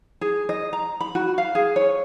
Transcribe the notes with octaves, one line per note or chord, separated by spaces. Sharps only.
G#4
D#5
A#5
B5
F#4
F5
G#4
C#5